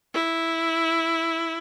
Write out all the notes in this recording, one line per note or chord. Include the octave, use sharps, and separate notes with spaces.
E4